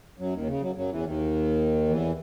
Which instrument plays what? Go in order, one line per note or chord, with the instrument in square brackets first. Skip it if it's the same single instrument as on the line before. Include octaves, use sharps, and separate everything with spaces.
[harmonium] F#2 F#3
D#2 D#3
C#3
F#2 F#3
F#2 F#3
E2 E3
D#2 D#3
E2 E3